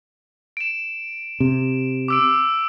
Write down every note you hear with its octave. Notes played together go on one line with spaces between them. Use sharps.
D7 E7
C3
D6 E6 D7